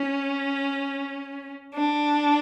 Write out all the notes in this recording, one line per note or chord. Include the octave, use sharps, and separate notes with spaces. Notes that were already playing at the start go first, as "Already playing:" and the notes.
Already playing: C#4
D4